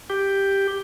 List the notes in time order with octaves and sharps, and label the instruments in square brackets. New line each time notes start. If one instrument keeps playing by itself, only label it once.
[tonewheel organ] G4